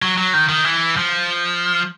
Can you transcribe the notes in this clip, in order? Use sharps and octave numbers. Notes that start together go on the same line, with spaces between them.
F#3
F#3
D#3
D#3
E3
F3